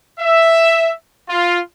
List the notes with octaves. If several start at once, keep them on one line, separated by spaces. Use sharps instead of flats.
E5
F4